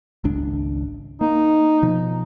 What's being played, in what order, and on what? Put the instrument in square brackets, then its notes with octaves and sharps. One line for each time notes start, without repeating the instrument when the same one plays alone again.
[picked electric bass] G#1 C#2 D4
[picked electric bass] A#3 [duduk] D#4
[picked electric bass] B2 F3